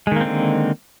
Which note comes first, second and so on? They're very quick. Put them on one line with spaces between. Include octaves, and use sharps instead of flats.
G#3 D#3 A#3 C4 D3